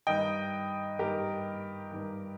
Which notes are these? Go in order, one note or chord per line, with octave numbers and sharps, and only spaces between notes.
G2 D#3 D#5 G5
G2 D#3 G4 A#4
G2 D#3